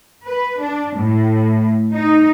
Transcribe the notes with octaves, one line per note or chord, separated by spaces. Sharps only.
B4
D4
A2
D#4